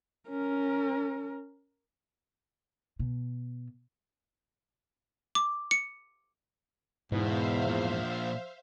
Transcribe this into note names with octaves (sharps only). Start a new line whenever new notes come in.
C#4 A#4
B2
D6
C#7
E2 G#2 B2 C5 E5 F5
A#2 F3